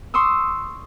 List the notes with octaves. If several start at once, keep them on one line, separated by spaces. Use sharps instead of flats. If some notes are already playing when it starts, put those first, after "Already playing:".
C6 C#6 D#6 E6